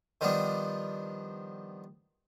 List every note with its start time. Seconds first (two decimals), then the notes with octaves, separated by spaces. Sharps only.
0.21 D#3 F3 G3 B3 D4